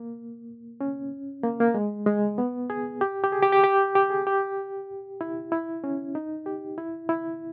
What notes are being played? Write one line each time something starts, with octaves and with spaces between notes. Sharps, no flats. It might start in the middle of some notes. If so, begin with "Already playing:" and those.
Already playing: A#3
C#4
A#3
A#3
G#3
G#3
B3
G#4
G4
G4
G#4
G4
G4
G4
G4
G#4
G4
E4
E4
C#4
D#4
G4
E4
E4